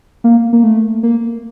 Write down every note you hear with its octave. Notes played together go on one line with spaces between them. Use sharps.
A#3
A#3
A3
A#3